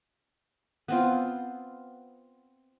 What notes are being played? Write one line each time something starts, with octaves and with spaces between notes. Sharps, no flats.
B3 C4 F4